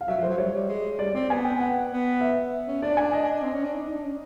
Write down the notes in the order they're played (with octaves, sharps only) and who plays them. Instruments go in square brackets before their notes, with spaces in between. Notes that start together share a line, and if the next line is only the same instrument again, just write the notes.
[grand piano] F5
[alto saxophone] F#3 [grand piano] E5
[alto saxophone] F3
[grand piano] C5
[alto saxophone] F#3
[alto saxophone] G3 [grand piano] C#5
[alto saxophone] G3
G#3
[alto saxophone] G3 [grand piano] D5
[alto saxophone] C4 [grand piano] D5
[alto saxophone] B3 [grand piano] G#5
[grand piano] G5
F#5
[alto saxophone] B3
[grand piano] E5
[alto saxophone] C#4
[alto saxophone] D4 [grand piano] D5
[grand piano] G#5
D#5
[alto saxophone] C4
C#4
D4
D#4
D4
C#4